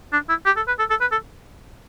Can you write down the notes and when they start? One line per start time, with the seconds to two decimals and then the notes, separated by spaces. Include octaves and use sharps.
0.12 D4
0.29 E4
0.46 G4
0.56 A4
0.67 B4
0.79 A4
0.90 A4
1.01 B4
1.12 A4